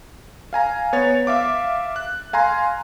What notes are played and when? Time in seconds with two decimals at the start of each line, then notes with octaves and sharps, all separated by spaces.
0.53 F5 G#5 A#5
0.93 B3 C#5 A6
1.27 E5 F5 D6
1.96 F#6
2.33 F5 G#5 A#5 C6